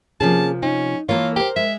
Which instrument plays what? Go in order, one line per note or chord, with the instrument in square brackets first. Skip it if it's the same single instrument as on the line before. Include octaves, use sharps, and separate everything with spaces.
[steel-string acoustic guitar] C3 F3 [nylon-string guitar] A#3 C#4 G#4 [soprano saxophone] A5
[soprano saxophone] C#4 [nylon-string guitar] D#4
[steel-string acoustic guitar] E3 A#3 A4 [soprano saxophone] F4 [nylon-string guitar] A#4 C#5
[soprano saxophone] G4 [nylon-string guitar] A#4 C5
[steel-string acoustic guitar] G#3 [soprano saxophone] E5